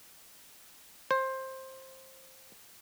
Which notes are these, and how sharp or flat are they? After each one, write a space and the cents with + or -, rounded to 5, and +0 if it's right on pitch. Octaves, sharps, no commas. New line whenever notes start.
C5 +15